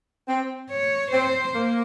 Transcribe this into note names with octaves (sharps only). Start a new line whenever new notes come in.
C4
C#5
C4 C5
A#3